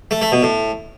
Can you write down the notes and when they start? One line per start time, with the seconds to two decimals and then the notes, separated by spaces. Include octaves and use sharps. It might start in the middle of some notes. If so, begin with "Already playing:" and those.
0.11 A3
0.22 A3
0.32 B2
0.43 A2